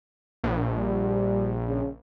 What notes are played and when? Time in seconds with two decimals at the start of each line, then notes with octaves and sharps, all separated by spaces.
0.44 A#1
0.77 G3
1.67 C#3